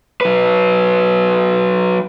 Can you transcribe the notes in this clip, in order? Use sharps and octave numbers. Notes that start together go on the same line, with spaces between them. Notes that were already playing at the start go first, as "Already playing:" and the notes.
F#3 B4